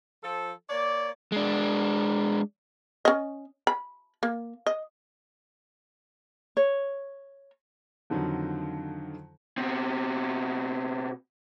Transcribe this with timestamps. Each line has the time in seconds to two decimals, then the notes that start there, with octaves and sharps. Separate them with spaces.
0.23 F3 A4
0.70 A#3 C#5 D5
1.32 G#3 D4
3.05 C#4 D#5
3.67 B5
4.23 A#3
4.66 D#5
6.57 C#5
8.10 F2 D3 D#3 F3 F#3
9.58 B2 C4